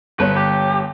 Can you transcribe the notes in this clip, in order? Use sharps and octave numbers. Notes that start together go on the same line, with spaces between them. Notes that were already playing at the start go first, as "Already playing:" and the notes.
G1 B4 C#5
G4